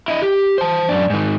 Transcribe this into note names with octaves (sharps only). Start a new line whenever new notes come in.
E4 D#5
G4
C5 A5
F#2 D4
G#2 D#3